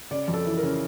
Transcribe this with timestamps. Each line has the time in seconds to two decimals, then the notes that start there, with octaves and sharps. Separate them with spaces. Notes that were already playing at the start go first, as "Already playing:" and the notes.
0.11 C#3 D5
0.28 F2
0.33 A4
0.46 E3
0.58 A#4
0.63 C#3